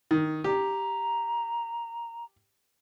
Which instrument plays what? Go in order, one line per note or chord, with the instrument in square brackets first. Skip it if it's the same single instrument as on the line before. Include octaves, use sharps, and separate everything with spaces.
[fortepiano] D#3
[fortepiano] G4 [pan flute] A#5